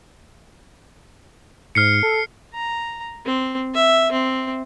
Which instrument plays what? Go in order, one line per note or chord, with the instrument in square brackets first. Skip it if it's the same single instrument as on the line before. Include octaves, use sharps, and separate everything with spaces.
[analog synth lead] G#2 [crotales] F6 C7 C#7
[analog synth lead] A4
[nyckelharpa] A#5
C4
E5
C4